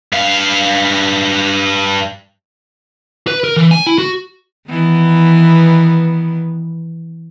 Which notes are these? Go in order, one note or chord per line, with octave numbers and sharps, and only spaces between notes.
G2 F5
B4
A#4
E3
G#5
E4
F#4
D#3 E3 B3